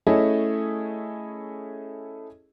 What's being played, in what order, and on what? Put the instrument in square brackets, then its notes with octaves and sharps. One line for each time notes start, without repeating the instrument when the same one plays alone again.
[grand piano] A3 C#4 E4 G#4 A4 D#5